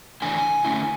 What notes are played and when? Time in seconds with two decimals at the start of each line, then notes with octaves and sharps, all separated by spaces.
0.22 C#3 E3 A3 D4 G#5
0.65 D3 A3 C#4 E4